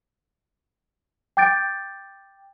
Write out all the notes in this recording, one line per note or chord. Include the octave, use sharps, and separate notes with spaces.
G5 D6 G6 A6 D7